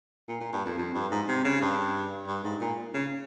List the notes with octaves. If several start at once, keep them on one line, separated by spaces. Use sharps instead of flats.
A#2
A#2
G2
F2
F2
G2
G#2
C3
C#3
G2
G2
G#2
A#2
C#3